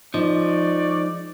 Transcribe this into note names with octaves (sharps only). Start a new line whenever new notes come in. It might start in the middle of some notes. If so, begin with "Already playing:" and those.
F3 G#3 D#4 D5 C#6